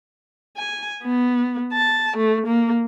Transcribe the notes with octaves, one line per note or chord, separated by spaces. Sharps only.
G#5
B3
A5
A3
A#3